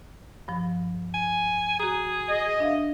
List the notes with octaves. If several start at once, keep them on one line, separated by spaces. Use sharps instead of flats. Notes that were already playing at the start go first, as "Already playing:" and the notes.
G2 F3
G#5
F#4 G#4 A#5
D#5
D4 E5 F5